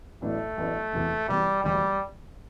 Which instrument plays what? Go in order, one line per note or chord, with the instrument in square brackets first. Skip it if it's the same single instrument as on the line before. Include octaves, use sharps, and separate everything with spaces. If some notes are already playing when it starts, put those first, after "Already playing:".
[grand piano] A1 A2 F#3 B3 D4 [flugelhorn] A3
[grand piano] A1 A2 F#3 B3 D4
E1 E2 C3
[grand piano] E1 E2 C3 [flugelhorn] G3
[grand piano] E1 D2 D3 A3 [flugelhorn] G3